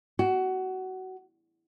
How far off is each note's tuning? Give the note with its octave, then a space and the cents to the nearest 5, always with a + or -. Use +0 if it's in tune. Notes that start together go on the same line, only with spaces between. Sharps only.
F#4 +20